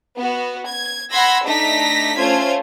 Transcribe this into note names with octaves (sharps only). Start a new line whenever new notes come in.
B3 F#4
G#6
F#5 B5 C6 E6 G#6 A#6
A3 D4 D#4 A#6 B6
A3 C#4 F4 C5 G#6